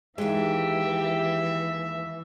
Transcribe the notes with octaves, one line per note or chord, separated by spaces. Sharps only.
D#2 E3 G#3 G4 E5